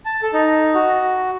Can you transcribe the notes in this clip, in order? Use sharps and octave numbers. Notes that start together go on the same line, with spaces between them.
A5
A4
D#4
F#4